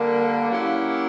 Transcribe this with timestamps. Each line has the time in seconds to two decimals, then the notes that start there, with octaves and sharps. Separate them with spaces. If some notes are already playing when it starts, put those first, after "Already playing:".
Already playing: D3 G3 A#3
0.49 F#3 A#3 C#4 E4 G4